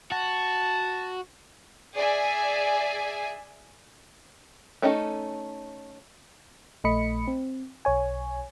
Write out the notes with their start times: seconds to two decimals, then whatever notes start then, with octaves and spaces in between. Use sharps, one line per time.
0.12 F#4 A5
1.96 G#4 D5 E5 G#5
4.82 A3 C#4 D#4 G#4 A4
6.84 A#1 A3 D#5 B5 C#7
7.28 C4
7.85 B1 C#5 G#5